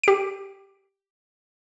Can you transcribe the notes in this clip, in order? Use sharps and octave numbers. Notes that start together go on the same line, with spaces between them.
G4 D7